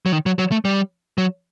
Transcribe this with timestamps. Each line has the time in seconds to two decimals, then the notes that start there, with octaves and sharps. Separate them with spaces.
0.06 F#3
0.12 D#3
0.26 F#3
0.39 F#3
0.51 A3
0.65 G3
1.18 F#3